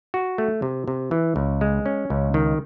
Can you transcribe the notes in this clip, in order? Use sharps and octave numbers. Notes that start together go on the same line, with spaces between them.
F#4
A3
C3
C3
E3
C#2
G#3
C#4
C#2
D#3